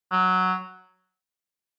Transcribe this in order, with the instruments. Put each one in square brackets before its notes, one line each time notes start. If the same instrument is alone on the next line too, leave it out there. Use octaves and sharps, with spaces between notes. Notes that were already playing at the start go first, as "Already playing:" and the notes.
[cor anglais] F#3